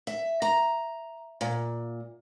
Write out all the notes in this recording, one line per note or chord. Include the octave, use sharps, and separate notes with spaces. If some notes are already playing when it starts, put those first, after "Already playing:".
E5
A#5
A#2